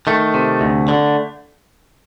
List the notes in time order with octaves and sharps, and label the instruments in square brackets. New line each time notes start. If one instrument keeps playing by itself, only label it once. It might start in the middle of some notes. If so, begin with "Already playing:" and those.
[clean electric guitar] D#3 A3
C3
D2
D3